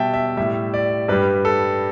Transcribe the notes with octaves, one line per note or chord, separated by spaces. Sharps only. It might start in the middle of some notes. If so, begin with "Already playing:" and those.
Already playing: B2 G3 E5 G5 A5
E5
A2 G3 E5
D5
G2 G3 B4
A4